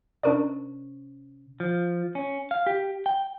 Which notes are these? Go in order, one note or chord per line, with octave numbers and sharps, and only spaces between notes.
C3 C#4 D4 A#4 D5
F3
C#4
F5
G4
G5